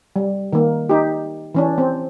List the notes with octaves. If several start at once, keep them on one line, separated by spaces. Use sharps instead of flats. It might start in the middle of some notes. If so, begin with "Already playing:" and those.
G3
D#3 A#3
D#4 G4
E3 C#4 D4
C4